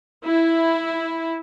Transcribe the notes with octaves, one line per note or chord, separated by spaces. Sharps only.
E4